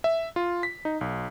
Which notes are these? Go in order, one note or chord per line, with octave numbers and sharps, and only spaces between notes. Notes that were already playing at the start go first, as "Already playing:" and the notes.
E5
F4
B6
D#4
B1